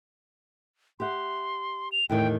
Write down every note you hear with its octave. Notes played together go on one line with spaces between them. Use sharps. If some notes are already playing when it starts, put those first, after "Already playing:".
G4 E5 F#5 C6
F7
E2 A2 D#3 G5